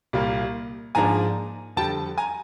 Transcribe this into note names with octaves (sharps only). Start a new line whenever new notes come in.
C2 A#2 G3 A#3
G#2 F3 A#3 D4 G#5 A#5
F2 D3 G3 G5 A5
G#5 A#5